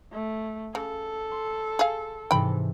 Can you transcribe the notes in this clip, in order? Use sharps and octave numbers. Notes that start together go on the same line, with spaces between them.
A3
C#3 A4
C6
G#4 F5
G#2 C3 E3 G5 B5